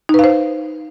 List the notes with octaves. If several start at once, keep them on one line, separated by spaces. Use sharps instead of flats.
D#4 B4 C5 F5